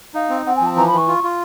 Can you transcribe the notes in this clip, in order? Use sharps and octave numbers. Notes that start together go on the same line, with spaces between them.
D#4 F5
C4
C4 F#5
G#5
F3
A5
E3 A#5
B5
E3
C#6
F4
F4